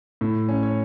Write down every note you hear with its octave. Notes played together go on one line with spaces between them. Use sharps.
A2
C#4
C#5